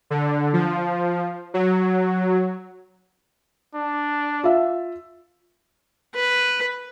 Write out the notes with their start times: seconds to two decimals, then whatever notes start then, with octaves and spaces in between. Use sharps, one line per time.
0.10 D3
0.53 F3
1.54 F#3
3.75 D4
4.44 F4 E5
6.15 B4